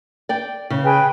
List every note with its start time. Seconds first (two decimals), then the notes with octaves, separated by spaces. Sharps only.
0.29 D5 G5
0.70 C#3
0.83 G#4 B4 G5